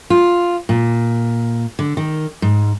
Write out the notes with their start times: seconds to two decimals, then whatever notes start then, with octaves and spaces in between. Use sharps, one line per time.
0.10 F4
0.69 A#2
1.79 D3
1.97 D#3
2.42 G#2